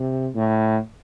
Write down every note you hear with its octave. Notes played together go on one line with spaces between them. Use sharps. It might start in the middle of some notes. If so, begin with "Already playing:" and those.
Already playing: C3
A2